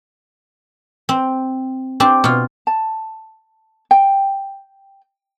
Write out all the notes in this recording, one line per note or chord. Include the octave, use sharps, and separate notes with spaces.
C4
C4 D4 G4
B2 F4
A5
G5